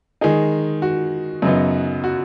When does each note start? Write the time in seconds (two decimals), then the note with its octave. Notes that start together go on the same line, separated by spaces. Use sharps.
0.21 D#3 G#3 D#4 G#4
0.82 F#4
1.42 F#2 C#3 F#3 B3 D#4
2.04 F#4